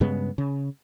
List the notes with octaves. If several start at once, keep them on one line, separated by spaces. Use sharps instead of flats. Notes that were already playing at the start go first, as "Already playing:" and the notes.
G2 C#3 G#3 B3
C#3